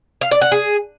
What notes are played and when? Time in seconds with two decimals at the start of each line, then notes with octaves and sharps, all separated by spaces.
0.21 F5
0.31 D5
0.42 F#5
0.52 G#4